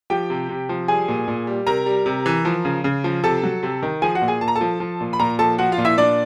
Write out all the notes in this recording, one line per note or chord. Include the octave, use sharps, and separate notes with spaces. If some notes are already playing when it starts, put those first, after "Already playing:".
F3 G4 G5
C3
C3
F3
G3 G#4 G#5
A#2
A#2
G3
C3 A#4 A#5
G3
C3
E3
F3
C#3
C#3
F3
C3 A4 A5
F#3
C3
D#3
F3 G#4 G#5
F#4 F#5
A#2
G#4 G#5
A#2 A5
A#5
A4 A5
F3
F3
A#2
B5
A#2 A#4 A#5
F3 A4 A5
F3 F#4 F#5
F4 F5
A#2
E4 E5
A#2 D4 D5